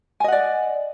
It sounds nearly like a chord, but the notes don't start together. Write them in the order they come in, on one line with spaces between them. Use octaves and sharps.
G#5 D#5 F#5 D5